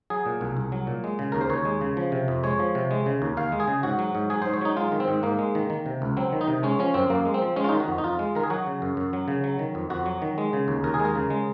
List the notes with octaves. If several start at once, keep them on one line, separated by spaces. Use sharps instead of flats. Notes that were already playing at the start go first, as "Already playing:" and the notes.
F#3 G#4
A#2
C2
C2
F#3
A#2
G#3
C#3
D#2 A#4
C5
D#2 C#5
G#3
C#3
F3
C3
F2
G#3 C#5
F3
C3
G#3
C#3
D#2
D#2 F5
G#3
G#4
C#3
G#2 F#4
F#3
G#2
F#3 G#4
G#2 C5
C#5
F#3 D#4
G#3 F4
D#3
C4
G#2
G#2 A#3
G#3
D#3
D#3
C3
C#2
F#3 C4
D#3
D#4
C3
G#3 C#4
F3 C#4
F#2 C4
F#2 A#3
G#3
C4
F3
G#3 C#4
F4
D#3 D#4
F#4
F2
D#4
F2 F4
G#3
D#3 A#4
G#4
F#3 F#4
C#3
F#2
F#2
F#3
C#3
F#3
D#3
F2
F2 F#4
F#3
D#3
G#3
C#3
D#2
D#2 A#4
G#4
G#3 A#4
C#3
G#3